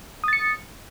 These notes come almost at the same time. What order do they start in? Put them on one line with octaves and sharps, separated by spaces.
D#6 A6 C#7